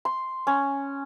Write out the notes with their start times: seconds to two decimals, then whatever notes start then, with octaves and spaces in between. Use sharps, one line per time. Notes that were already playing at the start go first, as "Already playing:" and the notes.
0.05 C6
0.47 C#4